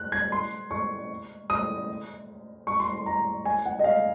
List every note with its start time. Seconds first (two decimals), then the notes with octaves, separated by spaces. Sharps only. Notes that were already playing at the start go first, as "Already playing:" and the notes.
Already playing: F#6
0.12 G#6
0.32 C6
0.71 C#6
1.50 D#6
2.67 C#6
2.80 C6
2.93 C6
3.06 A#5
3.45 G#5
3.66 F#5
3.79 D#5
3.84 F5